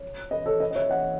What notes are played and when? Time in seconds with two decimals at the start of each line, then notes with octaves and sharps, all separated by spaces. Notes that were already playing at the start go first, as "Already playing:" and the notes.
Already playing: C#5
0.31 B4 D#5
0.46 A4 C#5
0.60 B4 D#5
0.71 D#5
0.75 C#5 E5
0.89 D#5 F#5